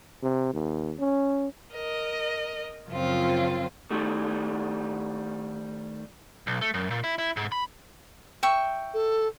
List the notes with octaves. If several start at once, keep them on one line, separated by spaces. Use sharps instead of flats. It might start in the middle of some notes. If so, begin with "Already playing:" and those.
C3
D#2
C#4
A#4 D#5
F#2 C#3 F3 C4 F4
D#3 G3 A3
B1
A3
F#2
A#2
E4
E4
G#2
B5
E5 G5 C#6
A4